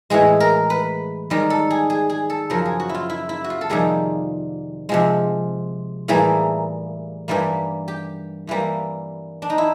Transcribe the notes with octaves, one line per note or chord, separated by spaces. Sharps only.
A2 E3 G#3 G#4
A#4
B4
G#2 D#3 G3 A#4
A4
G#4
G#4
G#4
A4
F#2 C#3 F3 A#4
G#4
F#4
E4
F4
E4
E4
F#4
F4
A4
F2 C3 D#3 G3 A#3 G#4
C3 F3 G#3
A2 E3 G3 A#3 G#4
G2 E3 G3 A#3
G4
G2 E3 G3 A#3
D4
D#4
E4